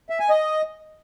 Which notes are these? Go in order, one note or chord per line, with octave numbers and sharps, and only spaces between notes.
E5
G#5
D#5